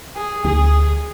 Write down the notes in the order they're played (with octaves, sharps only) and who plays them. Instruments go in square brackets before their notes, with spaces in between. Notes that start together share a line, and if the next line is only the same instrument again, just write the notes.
[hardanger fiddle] G#4
[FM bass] D2 [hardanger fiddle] G#4